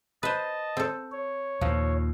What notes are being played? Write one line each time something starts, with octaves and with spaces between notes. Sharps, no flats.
B4 C5 D#5 A5
C4 A4
C#5
D#2 A#2 F3